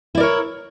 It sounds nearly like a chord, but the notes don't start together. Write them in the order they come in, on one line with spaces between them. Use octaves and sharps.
E4 D5 A#4 C#5